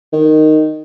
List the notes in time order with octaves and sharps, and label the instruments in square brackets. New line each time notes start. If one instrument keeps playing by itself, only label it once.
[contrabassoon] D#3